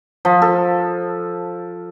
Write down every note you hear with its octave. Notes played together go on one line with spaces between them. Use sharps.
F3
A4